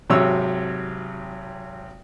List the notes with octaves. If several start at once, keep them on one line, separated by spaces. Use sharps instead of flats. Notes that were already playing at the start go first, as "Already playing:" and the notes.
G#1 C3 F#3 C#5 E6